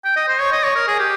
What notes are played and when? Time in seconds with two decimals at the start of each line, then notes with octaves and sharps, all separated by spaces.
0.04 G5
0.16 D#5
0.28 C5
0.40 C#5
0.52 D#5
0.63 C#5
0.75 A#4
0.87 G#4
0.99 G4